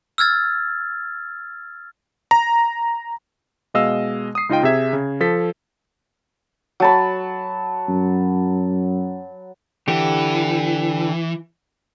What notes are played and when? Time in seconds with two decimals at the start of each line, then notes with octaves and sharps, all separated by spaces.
0.18 E6 F6 G#6 A6
2.31 A#5
3.74 B2 G#3 D#5 F5 E6
4.35 D#6 C7
4.49 C#2 D#4 F4 D#5 G5
4.63 C3 G#4 E5 G#6
4.93 C#3
5.20 F3 A4 B6
6.80 F#3 A5 B5
7.89 F#2
9.88 D3 E3 G4